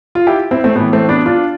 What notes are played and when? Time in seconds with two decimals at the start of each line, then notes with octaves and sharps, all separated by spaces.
0.15 F4
0.27 E4 G4
0.51 C4 E4
0.64 A3 C4
0.76 A2 E3 B3
0.93 A3 C4
1.09 B3 D4
1.26 D4 F4